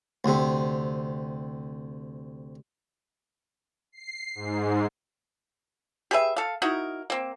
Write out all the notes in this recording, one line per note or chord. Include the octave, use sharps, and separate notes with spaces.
D2 C3
C7
G#2
G4 G#4 B4 E5
A4 F5
D#4 E4 F#4 A#4
A#3 C4